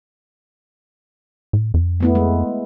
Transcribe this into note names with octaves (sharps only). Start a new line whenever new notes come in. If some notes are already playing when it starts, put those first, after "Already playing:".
A2
F2
A3 B3 E4
G#3